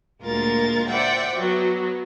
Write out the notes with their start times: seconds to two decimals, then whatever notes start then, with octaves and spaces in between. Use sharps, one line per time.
0.22 D2 A#2 G#3 F4 A#4 A6
0.88 C5 D5 E5 F#5 G5
1.36 F#3 B3